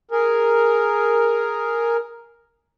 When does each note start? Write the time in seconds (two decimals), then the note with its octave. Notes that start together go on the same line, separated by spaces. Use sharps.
0.11 G#4 A#4